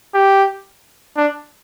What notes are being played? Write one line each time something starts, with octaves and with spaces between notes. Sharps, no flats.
G4
D4